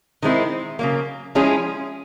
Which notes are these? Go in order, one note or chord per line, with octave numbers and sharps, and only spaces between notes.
D#3 G#3 C4 E4
C#3 F#3 A#3
F3 G#3 C#4 E4 G#4